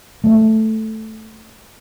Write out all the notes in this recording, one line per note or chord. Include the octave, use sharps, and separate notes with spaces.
A3